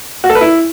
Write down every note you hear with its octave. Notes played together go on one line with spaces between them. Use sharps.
F#4
A4
B4
E4